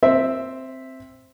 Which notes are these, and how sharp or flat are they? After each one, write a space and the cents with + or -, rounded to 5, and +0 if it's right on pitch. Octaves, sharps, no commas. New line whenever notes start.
C4 +0 E5 +0